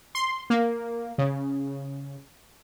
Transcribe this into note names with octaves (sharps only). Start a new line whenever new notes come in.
C6
A#3
C#3